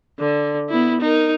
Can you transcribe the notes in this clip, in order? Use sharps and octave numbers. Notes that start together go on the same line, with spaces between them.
D3
B3 E4
D#4 A#4